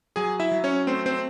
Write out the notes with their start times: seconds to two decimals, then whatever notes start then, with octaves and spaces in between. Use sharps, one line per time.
0.16 F#3 G#4 G#5
0.40 E4 E5
0.52 F#3
0.64 C#4 C#5
0.87 A3 C4 C5
1.06 C4 C5